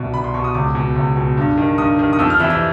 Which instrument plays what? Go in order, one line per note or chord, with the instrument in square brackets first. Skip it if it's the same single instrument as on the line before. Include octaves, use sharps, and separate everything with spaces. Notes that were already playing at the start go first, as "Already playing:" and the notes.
Already playing: [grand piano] C2 B2
C2 B5
C6
B2 C#6
D#6
C#2 D6
B2
C#2
B2
G2
D#3
G2 D#6
D#3
D#6
F2 E6
F6
C3 E3 E6
E6